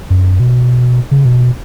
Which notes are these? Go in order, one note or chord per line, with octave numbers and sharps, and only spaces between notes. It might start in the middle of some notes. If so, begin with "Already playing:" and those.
F#2
B2
C#3
B2